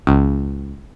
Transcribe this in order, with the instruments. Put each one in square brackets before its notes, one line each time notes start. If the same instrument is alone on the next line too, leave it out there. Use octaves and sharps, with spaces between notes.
[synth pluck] C#2